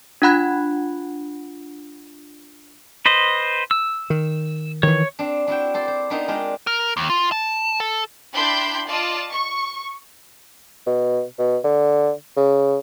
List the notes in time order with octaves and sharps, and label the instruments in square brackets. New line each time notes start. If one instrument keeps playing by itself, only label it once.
[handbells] D4 F4 F#5 B5 F#6 G#6
[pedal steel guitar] B4 C5 D#5
E6
[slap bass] D#3
[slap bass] D#3 E3 [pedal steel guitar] C#5
[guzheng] C4 D4
D4 E4 F#4 G5
A4 C5 D5 G5
C5
B3 C4 D4 D#4 F4 A#4
G#3 D4 F4 G4 A#4
[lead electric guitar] A#4
D#2
F4
A5
A4
[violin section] D4 E4 G5 B5 C6 G6
F4 D5 D#5 A5
C#6
[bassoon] B2
B2
D3
C#3